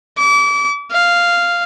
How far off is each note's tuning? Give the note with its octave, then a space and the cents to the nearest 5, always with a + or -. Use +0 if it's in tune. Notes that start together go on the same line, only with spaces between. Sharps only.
D6 -35
F5 -5